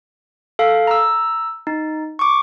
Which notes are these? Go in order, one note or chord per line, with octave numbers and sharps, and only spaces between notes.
A4 F5
A#5 E6
D#4
C#6 D6